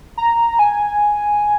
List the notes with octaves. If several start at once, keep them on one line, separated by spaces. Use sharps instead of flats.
A#5
G#5